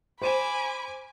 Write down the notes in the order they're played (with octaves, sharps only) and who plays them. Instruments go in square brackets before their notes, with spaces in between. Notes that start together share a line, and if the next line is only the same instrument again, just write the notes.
[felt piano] C5 D#7 E7 [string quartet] G#5 D6 [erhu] B5